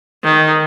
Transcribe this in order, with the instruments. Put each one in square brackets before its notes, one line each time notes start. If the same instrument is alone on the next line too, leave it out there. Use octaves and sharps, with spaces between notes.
[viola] D#3